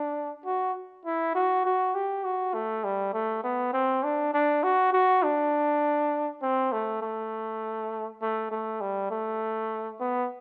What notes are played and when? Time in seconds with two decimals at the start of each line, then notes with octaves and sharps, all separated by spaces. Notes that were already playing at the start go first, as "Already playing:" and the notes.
Already playing: D4
0.45 F#4
1.05 E4
1.35 F#4
1.65 F#4
1.95 G4
2.25 F#4
2.54 A3
2.84 G3
3.13 A3
3.44 B3
3.74 C4
4.04 D4
4.34 D4
4.63 F#4
4.93 F#4
5.23 D4
6.42 C4
6.72 A3
7.02 A3
8.22 A3
8.51 A3
8.81 G3
9.11 A3
10.00 B3